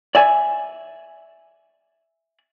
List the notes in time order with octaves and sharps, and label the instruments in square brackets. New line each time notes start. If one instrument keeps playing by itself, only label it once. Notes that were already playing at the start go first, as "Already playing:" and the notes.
[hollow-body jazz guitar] D5 E5 G#5